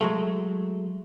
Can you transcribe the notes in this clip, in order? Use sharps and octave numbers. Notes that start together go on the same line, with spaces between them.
F#3 G#3 A3